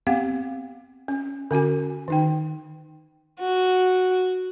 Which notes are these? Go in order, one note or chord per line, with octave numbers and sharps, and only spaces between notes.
B3 C4 G4 F5 F#5
C#4
D3 C#4 F#4 G#5
D#3 D#4 G5
F#4